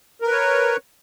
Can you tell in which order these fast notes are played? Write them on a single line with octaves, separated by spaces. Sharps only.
A#4 B4 C#5